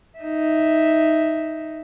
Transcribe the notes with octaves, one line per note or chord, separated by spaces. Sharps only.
D#4 E5